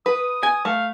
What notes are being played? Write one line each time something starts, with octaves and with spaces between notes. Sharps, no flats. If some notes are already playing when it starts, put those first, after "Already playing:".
B4 D#6
G#5
A3 F5